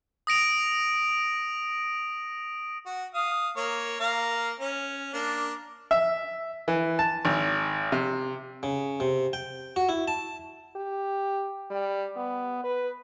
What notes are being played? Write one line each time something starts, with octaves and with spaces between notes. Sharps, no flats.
D#6 A#6 D7 F7
F#4
F5 D#6
A#3 C#5
A#3 F5 A#5
C#4
A#3 D4
E5
E3
A5
G#1
C3
C#3
C3
G5
F#4
E4
A5
G4
G3
B3
B4